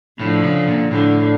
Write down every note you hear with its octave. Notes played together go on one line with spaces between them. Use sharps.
A2 D3 F3
C#3
A#2
A2 D3